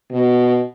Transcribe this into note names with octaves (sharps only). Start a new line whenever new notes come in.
B2